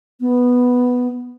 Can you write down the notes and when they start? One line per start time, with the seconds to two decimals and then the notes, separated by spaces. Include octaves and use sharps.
0.20 B3